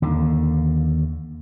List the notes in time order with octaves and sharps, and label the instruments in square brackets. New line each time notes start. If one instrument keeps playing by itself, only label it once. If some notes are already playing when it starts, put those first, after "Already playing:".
[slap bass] D#2 D3